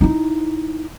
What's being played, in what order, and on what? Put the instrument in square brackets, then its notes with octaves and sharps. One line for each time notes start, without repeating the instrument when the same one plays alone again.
[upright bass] D#4 E4